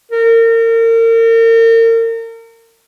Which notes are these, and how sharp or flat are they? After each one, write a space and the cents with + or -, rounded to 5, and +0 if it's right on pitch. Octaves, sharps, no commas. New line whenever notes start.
A#4 -35